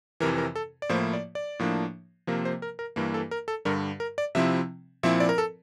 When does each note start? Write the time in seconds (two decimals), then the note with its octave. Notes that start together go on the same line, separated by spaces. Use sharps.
0.20 F2 C3 E3 A#4
0.38 A#4
0.56 A4
0.82 D5
0.89 A2 F3 A#3 E4 C5
1.13 D5
1.35 D5
1.59 A2 F3 A#3 D4
2.27 C3 F3 A#3 A#4
2.45 C5
2.62 A#4
2.79 A#4
2.96 G2 E3 A#3
3.14 A4
3.31 A#4
3.48 A4
3.65 G2 D3 G3 A#4
4.00 A#4
4.18 D5
4.35 C3 F3 C4 E4 E5
5.03 A#2 F3 C4 E4 E5
5.20 D5
5.29 A#4
5.38 A4